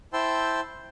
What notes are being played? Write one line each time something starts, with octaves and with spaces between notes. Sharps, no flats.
E4 C5 G5 A5 C6 E6